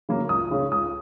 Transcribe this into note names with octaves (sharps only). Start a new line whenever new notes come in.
C#3 F#3 A#3
C#2 D#6
C#3 G#3 C#4
C#2 D#6